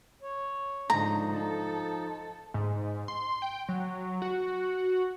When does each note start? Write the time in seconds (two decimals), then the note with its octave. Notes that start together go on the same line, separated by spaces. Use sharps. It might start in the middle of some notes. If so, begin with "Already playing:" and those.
0.22 C#5
0.90 G#2 D3 F3 D#4 A#5
1.36 A4
2.54 G#2
3.08 C6
3.42 G5
3.69 F#3
4.22 F#4